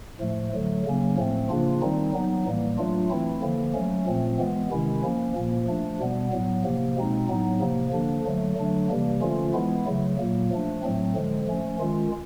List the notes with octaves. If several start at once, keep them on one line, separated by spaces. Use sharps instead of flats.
A2 F3 A3
D3 F#3 A3
C#3 F#3 A#3 C#4
A2 F3 A3 C4
C#3 F3 A#3 D4 F4
D#3 G3 C4 D#4
F#3 B3 D#4
A2 E3 G3 A#3
F#3 A3 D4 F4
E3 A3 C4 E4
D3 F3 A#3
F#3 A3 C#4
A#2 F3 A3 C4
E3 G#3 B3
C3 D#3 G#3 C#4 E4
F3 A#3 C#4
A#2 F3 A#3
F3 A3 D4
B2 G3 B3
A2 F#3 B3
C3 F3 A#3
B2 G#3 C4 D#4
A2 F#3 B3 D#4
C3 F3 A#3
D3 F3 A#3 D4
D3 F#3 A3
D3 F#3 A3 D4
C3 E3 G3 A#3
D3 F3 A3 C#4 F4
E3 G#3 B3 E4
C#3 F#3 A3
A#2 F#3 A#3
F3 A3 D4
A2 F#3 A3 C4
D3 F3 G#3
F3 A3 C#4
D#3 G#3 C#4 F4